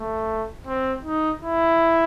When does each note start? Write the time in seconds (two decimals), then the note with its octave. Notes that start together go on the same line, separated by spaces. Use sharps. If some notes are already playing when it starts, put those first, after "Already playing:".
Already playing: A3
0.67 C4
1.05 D#4
1.43 E4